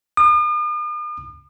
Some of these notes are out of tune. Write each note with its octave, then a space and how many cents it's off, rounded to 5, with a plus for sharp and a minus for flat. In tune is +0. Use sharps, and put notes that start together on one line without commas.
D#6 -45